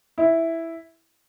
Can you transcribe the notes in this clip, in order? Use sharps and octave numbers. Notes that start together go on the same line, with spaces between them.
E4